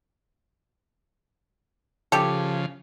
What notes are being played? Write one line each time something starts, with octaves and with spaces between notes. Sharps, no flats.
C#3 F3 G4 A4